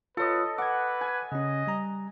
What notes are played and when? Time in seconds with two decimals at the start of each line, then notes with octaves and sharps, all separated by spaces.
0.17 F4 A4 B4 C#5 D#5
0.58 B4 F#5 D6 G#6
1.01 G#5
1.32 C#3 C#4 D#5
1.67 G3 A#5